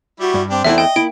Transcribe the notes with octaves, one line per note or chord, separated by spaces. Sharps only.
G3 E4 F#4
G2
C4 D4 G4
E2 A3 D4 E4 F#4 E5
D#5 G5
A#3 E4 D7